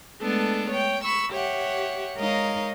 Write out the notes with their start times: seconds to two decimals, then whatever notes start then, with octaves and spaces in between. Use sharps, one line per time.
0.21 G#3 A3 B3 D4 A4
0.70 C#5 G5
1.03 B5 C#6 E6
1.32 G4 C#5 E5 F#5
2.16 G#3 D#4 A#4 C#5 D#5 F5